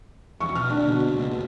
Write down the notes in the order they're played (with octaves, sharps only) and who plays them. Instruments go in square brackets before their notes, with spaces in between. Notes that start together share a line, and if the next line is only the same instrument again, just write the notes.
[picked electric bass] E2 F3 [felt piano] C#6
[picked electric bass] B2 [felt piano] F6
[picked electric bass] D3 A#3 [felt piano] D4
[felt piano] B2
[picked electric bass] C#2
G#1 D2